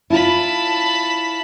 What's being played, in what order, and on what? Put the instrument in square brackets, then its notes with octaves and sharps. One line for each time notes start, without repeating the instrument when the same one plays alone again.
[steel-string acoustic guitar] E4 F4 [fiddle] A5 B5